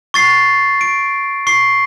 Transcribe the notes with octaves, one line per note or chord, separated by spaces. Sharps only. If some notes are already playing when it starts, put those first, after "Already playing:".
C#6 A6 C7
D7
C#6 C7